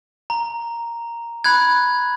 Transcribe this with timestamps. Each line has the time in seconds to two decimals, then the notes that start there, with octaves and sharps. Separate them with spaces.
0.30 A#5
1.44 B5 F#6 G#6